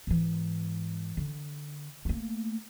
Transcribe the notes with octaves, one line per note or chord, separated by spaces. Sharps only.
G#2 E3
D3
A3 A#3